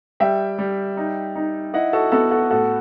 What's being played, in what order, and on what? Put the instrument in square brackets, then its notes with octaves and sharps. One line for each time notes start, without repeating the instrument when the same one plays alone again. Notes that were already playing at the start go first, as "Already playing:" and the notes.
[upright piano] G3 E5 G5
G3
D#4
D#4
E4 D#5 F#5
F#4 A4
B3 F#4 A4
F#4 A4
A2 F#4 A4